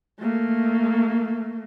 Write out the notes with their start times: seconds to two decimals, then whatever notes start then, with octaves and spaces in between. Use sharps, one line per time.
0.20 A3 A#3